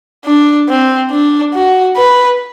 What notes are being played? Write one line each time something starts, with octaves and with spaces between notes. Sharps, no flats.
D4
C4
D4
F#4
B4